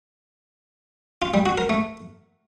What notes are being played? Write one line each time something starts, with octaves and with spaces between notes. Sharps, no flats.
F4
G3
F#4
A#4
A3